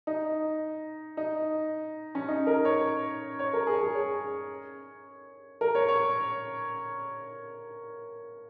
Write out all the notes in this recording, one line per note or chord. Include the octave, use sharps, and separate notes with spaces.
D#4
D#4
C#4
D#4
A#4
C#5
C#5
A#4
G#4
G#4
C#5
A#4
C#5
C#5